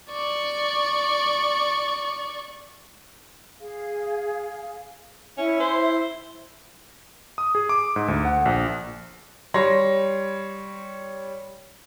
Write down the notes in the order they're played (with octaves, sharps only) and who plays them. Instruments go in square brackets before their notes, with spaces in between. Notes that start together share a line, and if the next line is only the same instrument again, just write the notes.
[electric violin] D5 C#6
[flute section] G#4 F5
[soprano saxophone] C#4 [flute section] E4 E5
[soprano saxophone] C5
[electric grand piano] D#6
G#4
D6
G#2
D2
F#5
A#1
[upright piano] G3 C#5 C6 A#6